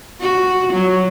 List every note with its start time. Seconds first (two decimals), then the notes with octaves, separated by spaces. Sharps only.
0.21 F#4
0.73 F#3